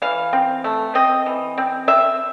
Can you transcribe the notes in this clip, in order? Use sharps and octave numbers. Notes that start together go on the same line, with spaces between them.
E3 F5
C4
A3
C4 D#5
E3
C4
C4 E5